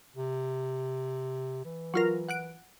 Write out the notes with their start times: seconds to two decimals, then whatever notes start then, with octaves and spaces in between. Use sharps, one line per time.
0.16 C3
1.65 E3
1.94 F#3 F4 A#4
2.29 F#5 F#6 D7